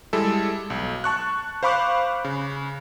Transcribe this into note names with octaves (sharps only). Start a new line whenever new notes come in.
G3 G#3 E4 A4
B1
A5 C#6 F#6
C5 F5 B5 C#6 D6 F#6
C#3